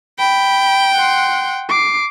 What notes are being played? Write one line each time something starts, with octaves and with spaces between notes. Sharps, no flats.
G5 B5
F#5 C6
D6 C7